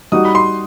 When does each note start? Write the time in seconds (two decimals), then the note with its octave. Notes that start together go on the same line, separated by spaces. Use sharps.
0.12 G3 D#4 F#4 D#6
0.25 B5
0.35 C6